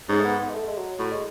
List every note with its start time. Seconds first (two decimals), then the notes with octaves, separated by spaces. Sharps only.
0.09 G#2 C#4
0.19 A3
0.24 B3
0.40 B3
0.49 G#3
0.54 A3
0.67 G#3
0.77 F#3
0.99 A2 F#3
1.11 G#3